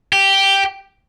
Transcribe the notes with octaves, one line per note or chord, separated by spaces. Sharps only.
G4